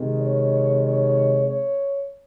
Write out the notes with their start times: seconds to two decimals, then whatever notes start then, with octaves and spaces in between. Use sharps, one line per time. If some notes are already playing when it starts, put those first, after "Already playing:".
Already playing: C3 D#3 G#3
0.20 C#5
0.82 C#5
1.44 C#5